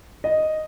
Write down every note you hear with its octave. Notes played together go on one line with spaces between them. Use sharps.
D#5